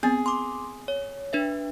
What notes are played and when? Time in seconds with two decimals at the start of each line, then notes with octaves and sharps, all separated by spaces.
0.03 B3 C4 G#4
0.26 C6 D6
0.88 C#5
1.33 D4 B4 E5